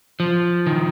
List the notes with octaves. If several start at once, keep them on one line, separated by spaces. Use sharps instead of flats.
F3
D#3